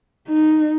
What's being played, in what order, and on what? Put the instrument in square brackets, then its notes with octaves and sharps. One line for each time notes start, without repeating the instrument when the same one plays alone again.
[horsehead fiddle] D#4